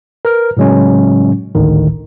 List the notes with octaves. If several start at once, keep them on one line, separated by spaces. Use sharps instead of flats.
A#4 B4 F6
A2 C#3 F#3 G#3 C#4
G#1 D2 A2 D3 D#3